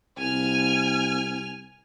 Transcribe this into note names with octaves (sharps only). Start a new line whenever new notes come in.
C2 G#5 F6